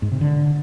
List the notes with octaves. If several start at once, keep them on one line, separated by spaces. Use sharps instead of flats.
G#2
C3
D3